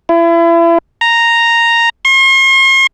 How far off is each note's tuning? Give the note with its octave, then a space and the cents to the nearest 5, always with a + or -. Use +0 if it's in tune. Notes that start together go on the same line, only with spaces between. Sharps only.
E4 +35
A#5 -5
C6 +45